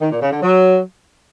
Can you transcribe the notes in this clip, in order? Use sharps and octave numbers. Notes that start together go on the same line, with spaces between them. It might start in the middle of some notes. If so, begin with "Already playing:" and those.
D#3
A#2
C#3
D3
F#3